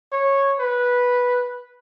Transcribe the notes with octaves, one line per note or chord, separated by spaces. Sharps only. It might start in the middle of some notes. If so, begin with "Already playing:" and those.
C#5
B4